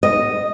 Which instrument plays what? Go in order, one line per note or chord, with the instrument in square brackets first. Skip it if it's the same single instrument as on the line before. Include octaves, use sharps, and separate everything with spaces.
[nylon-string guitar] D#5